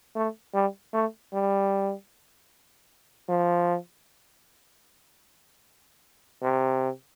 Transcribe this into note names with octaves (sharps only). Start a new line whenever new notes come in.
A3
G3
A3
G3
F3
C3